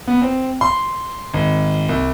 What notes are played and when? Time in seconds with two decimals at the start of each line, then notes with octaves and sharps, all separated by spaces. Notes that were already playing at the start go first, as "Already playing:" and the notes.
0.07 B3
0.22 C4
0.61 C6
1.34 G#1
1.89 C2